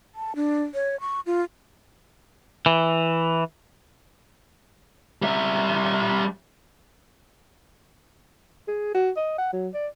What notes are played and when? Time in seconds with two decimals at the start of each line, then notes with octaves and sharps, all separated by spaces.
0.15 A5
0.36 D4
0.74 C#5
1.00 C#6
1.26 F4
2.66 E3
5.22 G3 E5
8.68 G#4
8.94 F#4
9.17 D#5
9.38 F#5
9.53 F#3
9.74 D5